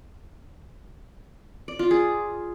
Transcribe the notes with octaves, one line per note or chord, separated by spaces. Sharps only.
D5
F4
G#4